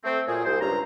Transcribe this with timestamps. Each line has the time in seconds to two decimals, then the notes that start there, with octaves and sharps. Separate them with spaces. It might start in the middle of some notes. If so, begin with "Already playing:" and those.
0.04 A3 C4
0.27 A#2 F#3 F4 G#4
0.44 C2 C5
0.61 C#2 G2 A#5